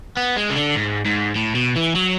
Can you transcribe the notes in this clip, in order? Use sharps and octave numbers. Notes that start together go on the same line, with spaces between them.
B3
G#3
C#3
D3
G#2
G#2
A2
B2
E3
F#3